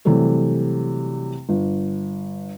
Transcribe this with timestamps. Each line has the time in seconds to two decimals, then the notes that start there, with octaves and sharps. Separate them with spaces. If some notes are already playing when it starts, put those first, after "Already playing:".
0.05 C3 E3 F#3 G3 A3
1.49 G1